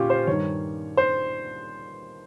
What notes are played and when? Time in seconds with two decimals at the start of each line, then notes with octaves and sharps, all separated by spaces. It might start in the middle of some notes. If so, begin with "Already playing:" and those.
Already playing: A#2 C#4 F4 G4
0.10 C5
0.27 G2 D#3 C#5
0.97 C5